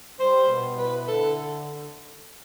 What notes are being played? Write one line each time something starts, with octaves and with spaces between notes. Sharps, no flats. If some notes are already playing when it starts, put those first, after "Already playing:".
G3 C5
B2
E4 B4
D3 A4